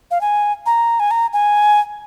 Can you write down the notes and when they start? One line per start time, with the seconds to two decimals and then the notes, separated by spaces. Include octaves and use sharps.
0.11 F5
0.21 G#5
0.66 A#5
1.00 G#5
1.11 A#5
1.33 G#5